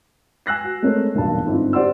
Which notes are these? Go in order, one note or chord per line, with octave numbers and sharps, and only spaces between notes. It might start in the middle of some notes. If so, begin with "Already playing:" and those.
G#5 E6 F#6 A#6 C7
F#4
G#3 A3 C4 C#4 A#4
E1 B1 G2 A#2 A5
G1 G#2 D3 C4 E4 F4
G4 C5 D5 F#5 C6 E6